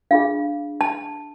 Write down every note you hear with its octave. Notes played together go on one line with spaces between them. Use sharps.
D4 F4 G#4 F5
A5